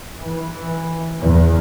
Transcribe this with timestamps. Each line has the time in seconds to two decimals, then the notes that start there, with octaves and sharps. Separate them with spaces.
0.19 E3
1.20 E2